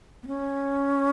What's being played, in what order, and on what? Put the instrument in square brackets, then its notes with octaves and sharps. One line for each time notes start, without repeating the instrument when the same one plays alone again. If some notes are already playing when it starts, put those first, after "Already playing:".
[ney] B3
C#4